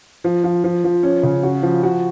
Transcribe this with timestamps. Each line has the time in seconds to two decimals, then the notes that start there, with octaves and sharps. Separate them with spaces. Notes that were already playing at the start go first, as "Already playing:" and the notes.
0.24 F3
0.44 F3
0.64 F3
0.84 F3
1.03 C#4
1.23 C#3
1.43 F#4
1.63 F3
1.83 F#4